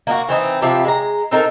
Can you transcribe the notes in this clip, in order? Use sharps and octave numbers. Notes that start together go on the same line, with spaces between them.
A#3 D#4 F#4
E3 C4 D#4
C3 F3 E4 G4
G#3 A#5
C4 D#4 A4 A#4